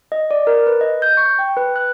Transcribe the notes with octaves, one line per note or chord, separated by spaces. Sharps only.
D#5
D5
A#4
B4
D#5
G6
C#6
G5
B4
F#6